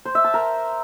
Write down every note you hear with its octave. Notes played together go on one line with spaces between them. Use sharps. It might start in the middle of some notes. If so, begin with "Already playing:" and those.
C5
E5
A5
A#4